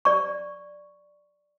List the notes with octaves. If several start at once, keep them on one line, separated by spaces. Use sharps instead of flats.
D5 C#6